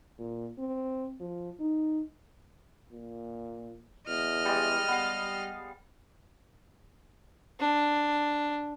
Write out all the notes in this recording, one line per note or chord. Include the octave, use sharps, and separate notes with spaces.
A#2
C4
F3
D#4
A#2
E2 D#5 F6
G3 G#3
G3 B3 F5
D4